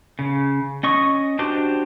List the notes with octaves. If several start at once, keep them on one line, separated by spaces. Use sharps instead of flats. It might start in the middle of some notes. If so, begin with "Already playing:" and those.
C#3
C#4 D#5 C#6 D#6
D4 F#4 G4 C5 D6